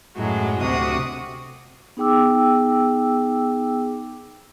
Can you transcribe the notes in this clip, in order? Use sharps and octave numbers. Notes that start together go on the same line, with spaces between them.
F#2 A2 F#3 G#3
D2 C3 F#4 D#6
B3 D#4 G#4 G5 D6 E6